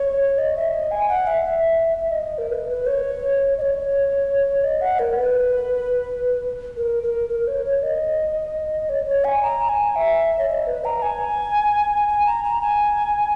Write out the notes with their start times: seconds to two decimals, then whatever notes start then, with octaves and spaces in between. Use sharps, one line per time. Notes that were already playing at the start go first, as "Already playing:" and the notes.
Already playing: C#5
0.38 D#5
0.56 E5
0.74 D#5
0.91 G#5
1.09 F#5
1.27 E5
1.45 E5
1.98 E5
2.11 D#5
2.25 D#5
2.38 A#4
2.51 B4
2.69 B4
2.86 C#5
3.58 D#5
3.61 C#5
4.64 D#5
4.81 F#5
4.99 A#4
5.17 B4
6.77 A#4
7.03 A#4
7.30 A#4
7.47 C#5
7.66 C#5
7.83 D#5
8.89 C#5
9.07 C#5
9.24 G#5
9.43 A#5
9.69 G#5
9.96 E5
10.39 C#5
10.49 D#5
10.67 B4
10.85 A#5
11.02 G#5
12.09 G#5
12.26 A#5
12.44 A#5
12.61 G#5